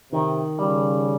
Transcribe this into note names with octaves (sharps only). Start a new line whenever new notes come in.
C3 D#3
C#3 G3